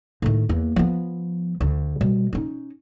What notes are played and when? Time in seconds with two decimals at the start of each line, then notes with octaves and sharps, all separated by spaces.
0.22 A2 D#3
0.49 E2 A#3
0.76 F3 B3
1.61 D2
2.01 B2 G3
2.33 C#4 D#4